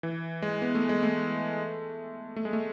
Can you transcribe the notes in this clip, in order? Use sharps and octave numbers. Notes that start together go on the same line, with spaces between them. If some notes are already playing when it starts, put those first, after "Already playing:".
E3
G#3
B3
A3
G#3
A3
A3
G#3
A3